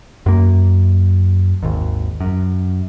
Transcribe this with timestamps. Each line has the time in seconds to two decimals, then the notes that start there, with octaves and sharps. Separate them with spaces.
0.26 F#2 A#3
1.63 G#1 D#2
2.21 F#2